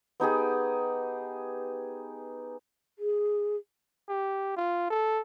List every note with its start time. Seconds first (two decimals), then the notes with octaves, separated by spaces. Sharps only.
0.20 B3 D#4 G4 G#4
2.99 G#4
4.09 G4
4.56 F4
4.90 A4